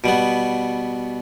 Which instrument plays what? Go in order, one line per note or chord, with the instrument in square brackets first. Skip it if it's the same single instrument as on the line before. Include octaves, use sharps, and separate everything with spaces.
[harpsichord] B2 G3 B3